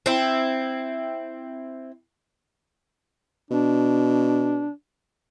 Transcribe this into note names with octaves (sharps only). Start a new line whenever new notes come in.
C4 E4
B2 D4